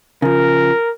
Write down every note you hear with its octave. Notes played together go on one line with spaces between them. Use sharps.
C#3 F3 A#4